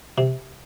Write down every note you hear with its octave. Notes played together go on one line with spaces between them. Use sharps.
C3